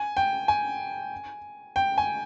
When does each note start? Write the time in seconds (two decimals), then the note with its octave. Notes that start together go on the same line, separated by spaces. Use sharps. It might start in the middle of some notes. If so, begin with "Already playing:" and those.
Already playing: G#5
0.17 G5
0.48 G#5
1.76 G5
1.98 G#5